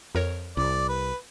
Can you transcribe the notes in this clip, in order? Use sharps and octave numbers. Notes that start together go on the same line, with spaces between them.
F2 A#4 C#5
C2 D5
B4